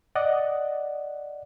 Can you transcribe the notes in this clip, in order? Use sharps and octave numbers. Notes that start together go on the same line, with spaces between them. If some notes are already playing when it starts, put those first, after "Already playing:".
D5 D#5 F#5